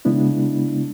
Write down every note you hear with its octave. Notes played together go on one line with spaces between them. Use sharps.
C#3 G#3 B3 D4 E4